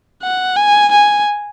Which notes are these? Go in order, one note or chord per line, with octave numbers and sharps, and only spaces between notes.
F#5
G#5
G#5